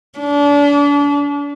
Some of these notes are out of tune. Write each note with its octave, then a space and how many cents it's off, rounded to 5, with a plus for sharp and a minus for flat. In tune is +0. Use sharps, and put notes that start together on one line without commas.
D4 -35